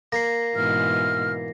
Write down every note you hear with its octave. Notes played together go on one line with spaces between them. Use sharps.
A#3 A#6 C7
G#2 B2 E3 F6